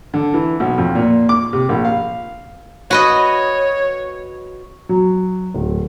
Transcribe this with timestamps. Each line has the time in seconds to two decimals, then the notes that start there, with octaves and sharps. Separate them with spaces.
0.14 D3
0.34 E3
0.60 B1
0.78 F2
0.95 A#2
1.29 D6
1.53 C3
1.69 A#1
1.85 F5
2.91 F#4 B4 C#5 D#5
4.89 F#3
5.55 D1